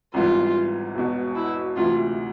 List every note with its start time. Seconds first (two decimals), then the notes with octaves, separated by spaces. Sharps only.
0.14 G#1 G#2 E3 G3 B3 F4
0.95 E1 E2 B2
1.36 E4
1.76 D2 C3 E3 F4